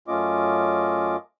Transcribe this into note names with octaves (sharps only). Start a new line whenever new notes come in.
F#2 A3 C#4 F4 D#5 D6